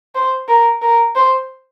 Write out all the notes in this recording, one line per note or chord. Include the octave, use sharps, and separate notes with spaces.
C5
A#4
A#4
C5